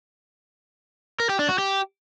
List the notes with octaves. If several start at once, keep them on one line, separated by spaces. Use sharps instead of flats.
A#4
G4
D4
F#4
G4